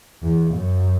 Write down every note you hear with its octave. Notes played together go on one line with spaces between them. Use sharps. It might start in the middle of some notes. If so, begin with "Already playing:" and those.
E2
F#2